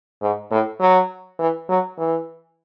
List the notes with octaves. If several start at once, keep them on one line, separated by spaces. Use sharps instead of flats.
G#2
A2
F#3
E3
F#3
E3